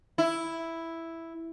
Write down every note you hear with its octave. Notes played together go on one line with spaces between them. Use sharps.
E4